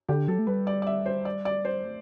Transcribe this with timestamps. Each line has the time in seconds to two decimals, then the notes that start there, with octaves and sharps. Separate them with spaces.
0.09 D3 G4
0.28 F#3 A4
0.39 A3
0.47 G3 B4
0.67 D5
0.82 D5
0.87 E5
1.06 C5
1.25 D5
1.45 D5
1.65 C5
1.84 A3